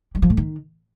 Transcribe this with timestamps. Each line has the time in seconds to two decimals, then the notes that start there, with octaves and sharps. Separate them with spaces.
0.15 G3
0.22 F3
0.30 A2
0.37 D#3